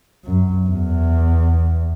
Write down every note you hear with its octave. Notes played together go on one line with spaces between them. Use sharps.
F#2
E2